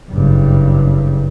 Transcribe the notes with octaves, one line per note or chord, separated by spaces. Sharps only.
F#1 G2